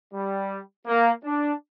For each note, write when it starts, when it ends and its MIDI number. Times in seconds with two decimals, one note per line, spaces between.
0.14 0.59 55
0.87 1.11 58
1.24 1.53 62